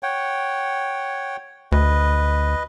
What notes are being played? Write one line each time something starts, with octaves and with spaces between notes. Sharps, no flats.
C#5 F#5 G5
D2 B4 D#5